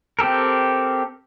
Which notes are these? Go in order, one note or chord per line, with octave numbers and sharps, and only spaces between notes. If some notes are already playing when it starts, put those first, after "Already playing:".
C4 G4 A4 A#4